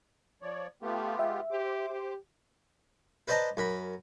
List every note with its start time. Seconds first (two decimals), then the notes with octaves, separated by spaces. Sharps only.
0.42 F3 C#5 D5
0.82 A3 B3 F4 G4
1.19 G#3 E5
1.51 G4 C5 D6
1.90 G4
3.28 B4 C5 D5 D#5 A5 A#5
3.57 F#2 A#4 B5